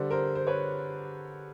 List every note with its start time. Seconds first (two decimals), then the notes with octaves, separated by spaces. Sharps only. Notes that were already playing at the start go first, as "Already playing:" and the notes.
Already playing: D3 G3 C5 D5
0.11 A#4 C5
0.35 C5
0.47 B4 C#5